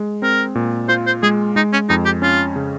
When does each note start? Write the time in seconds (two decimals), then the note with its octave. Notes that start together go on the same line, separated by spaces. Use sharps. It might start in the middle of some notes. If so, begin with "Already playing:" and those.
Already playing: G#3
0.22 C4 A#4
0.55 A#2
0.89 F4 C5
1.07 C5
1.23 G#3 G#4
1.56 G#3 D#4
1.73 C#4
1.89 F2 D#4
2.05 G4
2.22 C#4 F4
2.56 C#3